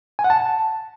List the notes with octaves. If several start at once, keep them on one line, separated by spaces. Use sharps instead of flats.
G#5
F#5
A5